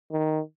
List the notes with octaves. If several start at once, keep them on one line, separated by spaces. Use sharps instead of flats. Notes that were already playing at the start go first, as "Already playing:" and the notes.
D#3